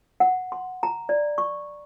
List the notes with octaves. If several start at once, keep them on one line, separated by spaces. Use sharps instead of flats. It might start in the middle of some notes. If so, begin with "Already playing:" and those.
F#5
C6
A#5
D5
C#6